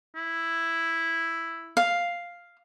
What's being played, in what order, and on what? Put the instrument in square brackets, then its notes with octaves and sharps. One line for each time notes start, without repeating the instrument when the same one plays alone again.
[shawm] E4
[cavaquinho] F5